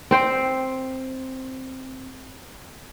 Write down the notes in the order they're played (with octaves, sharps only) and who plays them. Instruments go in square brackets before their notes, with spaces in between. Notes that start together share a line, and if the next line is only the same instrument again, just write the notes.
[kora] C4 C5 G5